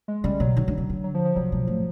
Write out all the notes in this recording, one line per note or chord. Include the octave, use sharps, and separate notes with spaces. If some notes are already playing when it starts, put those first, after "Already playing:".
G#3
C#3 G3
B2 F#3
D#3
D3
C#3
D3
F#3
F3
F3
C3 F#3
B2
A2